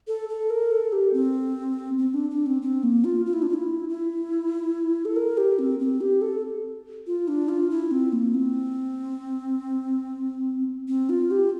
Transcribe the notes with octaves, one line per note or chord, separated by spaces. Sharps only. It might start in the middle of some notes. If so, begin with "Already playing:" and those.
A4
A4
A#4
A4
G4
C4
C4
D4
D4
C4
C4
A#3
F4
F4
E4
D4
F4
E4
E4
A4
A#4
G4
C4
C4
G4
A4
F4
D4
F4
E4
C4
A#3
C4
C4
F4
G4